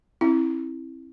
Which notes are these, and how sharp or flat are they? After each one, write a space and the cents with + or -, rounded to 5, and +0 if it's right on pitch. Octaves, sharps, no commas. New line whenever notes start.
C4 +35 E4 -5